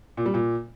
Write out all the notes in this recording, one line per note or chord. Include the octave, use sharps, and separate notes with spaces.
A#2
G3
A#2